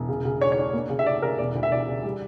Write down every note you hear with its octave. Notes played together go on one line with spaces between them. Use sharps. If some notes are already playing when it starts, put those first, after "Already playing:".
Already playing: E1
C#3
C#3
D4 C#5
C#5
D4
A#3
C#3
E5
C#3 D5
C#3 A#4
E1 D5
D2
E5
E1 D5
C#3
G3